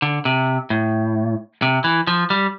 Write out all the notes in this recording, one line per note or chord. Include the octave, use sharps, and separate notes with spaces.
D3
C3
A2
C3
E3
F3
G3